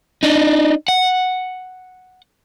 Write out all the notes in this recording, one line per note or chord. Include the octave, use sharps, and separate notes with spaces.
D4 D#4
F#5